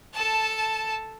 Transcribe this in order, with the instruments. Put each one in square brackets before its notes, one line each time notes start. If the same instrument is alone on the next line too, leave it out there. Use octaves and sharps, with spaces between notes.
[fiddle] A4 A5